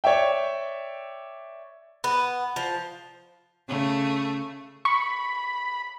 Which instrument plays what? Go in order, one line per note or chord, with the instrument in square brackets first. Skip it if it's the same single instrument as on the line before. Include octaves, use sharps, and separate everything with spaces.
[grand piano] C#5 D5 E5 G5
[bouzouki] B3
F3
[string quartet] C#3 A3
[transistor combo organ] B5 [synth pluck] C#6